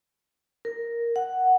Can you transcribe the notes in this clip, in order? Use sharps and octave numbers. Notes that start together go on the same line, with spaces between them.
A#4
F#5